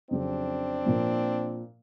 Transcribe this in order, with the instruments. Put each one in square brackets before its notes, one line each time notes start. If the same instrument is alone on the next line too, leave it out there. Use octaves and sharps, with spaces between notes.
[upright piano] F2 C#3 F#3 [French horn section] C4 D4
[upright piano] A#2 F3 A#3